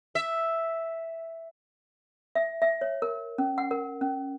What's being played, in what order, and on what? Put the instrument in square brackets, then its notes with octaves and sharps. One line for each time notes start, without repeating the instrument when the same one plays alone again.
[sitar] E5
[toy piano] E5
E5
C#5
A#4
C#4
F#5
A#4
C#4